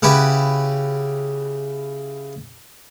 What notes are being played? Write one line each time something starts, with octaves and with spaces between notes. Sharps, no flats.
C#3 E4 F#4 G4 B4